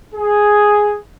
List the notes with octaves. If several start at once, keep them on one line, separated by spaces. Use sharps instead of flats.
G#4